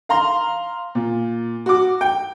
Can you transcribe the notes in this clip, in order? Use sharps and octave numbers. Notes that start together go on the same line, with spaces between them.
F5 A#5 C6
A#2
F#4 D6
G5